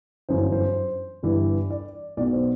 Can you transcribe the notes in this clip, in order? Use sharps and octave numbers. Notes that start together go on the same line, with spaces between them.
G1 F#2 E3 C5
C5
G1 G2 E3
D5
B1 B2 D5
C5